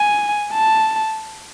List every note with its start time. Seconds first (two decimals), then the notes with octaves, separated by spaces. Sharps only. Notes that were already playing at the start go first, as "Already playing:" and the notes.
Already playing: G#5
0.54 A5